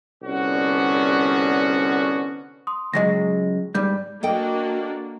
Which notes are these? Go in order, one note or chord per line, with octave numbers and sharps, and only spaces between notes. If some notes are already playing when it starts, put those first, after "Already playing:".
C2 D3 B3 C#4 F#4
C6 D#6
C#2 F#3 G#3 D#5 A#6
G#2 G3 D5 G6
A#3 D4 F#4 A4 D#5 G5